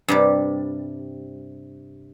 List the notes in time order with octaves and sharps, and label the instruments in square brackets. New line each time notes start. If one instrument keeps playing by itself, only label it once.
[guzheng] G2 C3 G3